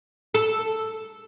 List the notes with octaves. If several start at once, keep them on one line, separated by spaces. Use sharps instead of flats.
A4